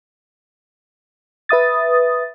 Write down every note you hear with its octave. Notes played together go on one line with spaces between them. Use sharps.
B4 E5 D#6 A6